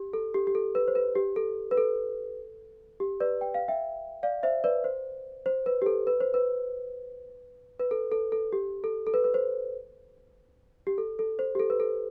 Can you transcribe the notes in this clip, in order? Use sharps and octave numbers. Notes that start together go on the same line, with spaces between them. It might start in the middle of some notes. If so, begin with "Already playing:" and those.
Already playing: G4
A4
G4
G4
A4
B4
C5
B4
G4
A4
B4
A4
G4
B4 D5
G5
F5
E5 G5
D5 F5
C5 E5
B4 D5
C5
C5
B4
G4
A4
B4
C5
B4
B4
A4
A4
A4
G4
A4
A4
B4
B4
C5
G4
A4
A4
C5
G4
A4
B4
A4